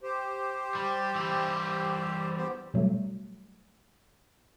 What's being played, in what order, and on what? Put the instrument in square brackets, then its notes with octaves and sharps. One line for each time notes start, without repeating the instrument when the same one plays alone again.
[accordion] G4 C5
[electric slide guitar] G3
E3 G3
[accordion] B3 G4 C5
[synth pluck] B2 F#3 G3 A3